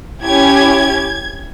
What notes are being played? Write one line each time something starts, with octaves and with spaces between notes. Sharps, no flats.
C#4 E4 G4 G#6